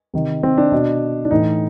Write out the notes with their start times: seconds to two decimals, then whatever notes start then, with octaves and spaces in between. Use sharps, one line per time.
0.14 C3 D#3
0.43 C4
0.58 D4
0.72 B2
1.25 D4
1.31 A2 E3 D#4